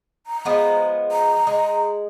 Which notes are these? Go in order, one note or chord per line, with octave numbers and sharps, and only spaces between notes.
A#5
F3 G#3 B3
A#5
G#3